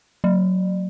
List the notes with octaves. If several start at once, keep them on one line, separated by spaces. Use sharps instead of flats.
F#3